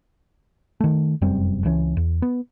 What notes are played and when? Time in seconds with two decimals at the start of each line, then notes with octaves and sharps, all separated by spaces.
0.80 D#3 A3
1.22 F1 F#2 G3 C4
1.65 C#2 E3 C#4
1.97 E2
2.22 B3